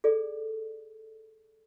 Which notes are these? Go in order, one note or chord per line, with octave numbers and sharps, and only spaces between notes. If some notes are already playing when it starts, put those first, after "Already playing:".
G#4 A4 D5